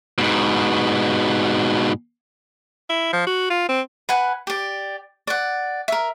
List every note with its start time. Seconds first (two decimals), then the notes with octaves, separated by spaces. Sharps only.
0.18 G#2 B2
2.89 E4
3.13 F3
3.27 F#4
3.50 F4
3.69 C4
4.09 B4 F#5 G#5
4.47 G4 D5
5.27 D5 F#5
5.88 A#4 E5